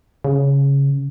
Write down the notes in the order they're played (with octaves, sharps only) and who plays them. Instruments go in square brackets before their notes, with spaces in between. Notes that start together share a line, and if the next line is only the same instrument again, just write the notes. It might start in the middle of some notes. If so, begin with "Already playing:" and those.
[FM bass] C#3